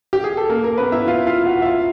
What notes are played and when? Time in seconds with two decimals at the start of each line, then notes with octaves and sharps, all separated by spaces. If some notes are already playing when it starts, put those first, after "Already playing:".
0.13 G4
0.24 G#4
0.37 A4
0.50 A#3 A#4
0.63 A#3 A#4
0.78 B3 B4
0.92 E4 E5
1.07 F4 F5
1.27 F4 F5
1.46 F#4 F#5
1.62 E5
1.65 F4 F5